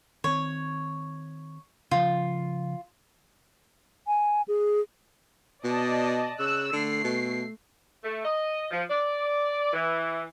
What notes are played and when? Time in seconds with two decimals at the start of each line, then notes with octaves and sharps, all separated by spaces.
0.24 D#3 C4 C#5
1.91 C#3 F3 F4
4.07 G#5
4.48 G#4
5.64 B2 D5 D#5 A5
6.39 C#3 E6 F#6
6.73 D3 A3 C7
7.04 B2
8.03 A3
8.23 D#5
8.71 F3
8.90 D5
9.73 E3